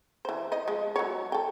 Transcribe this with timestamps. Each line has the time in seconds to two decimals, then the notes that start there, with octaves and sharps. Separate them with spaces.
0.25 E3 C5
0.52 C5 D#5
0.68 F3 G#3
0.96 F#3 C#5
1.32 A4 G5